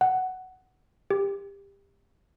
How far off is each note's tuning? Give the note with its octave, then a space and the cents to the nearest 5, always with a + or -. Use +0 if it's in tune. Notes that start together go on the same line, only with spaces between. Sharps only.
F#5 +10
G4 +25